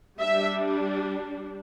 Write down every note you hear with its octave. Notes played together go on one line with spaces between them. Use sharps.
G3 D4 E5